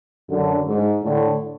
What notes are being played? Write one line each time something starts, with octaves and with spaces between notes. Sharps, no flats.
F#2 D3
G#2
A2 D3